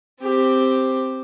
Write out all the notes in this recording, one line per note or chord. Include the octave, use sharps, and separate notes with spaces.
C4 G4